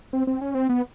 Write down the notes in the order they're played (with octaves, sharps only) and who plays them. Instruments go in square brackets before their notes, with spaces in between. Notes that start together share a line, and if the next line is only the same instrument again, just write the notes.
[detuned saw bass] C4
C4
C#4
C4
B3